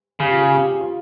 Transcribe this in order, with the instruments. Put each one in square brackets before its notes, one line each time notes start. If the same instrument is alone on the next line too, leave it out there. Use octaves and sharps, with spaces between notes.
[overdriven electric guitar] C#3 [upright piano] G4
[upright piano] F4
G#4
G4
F4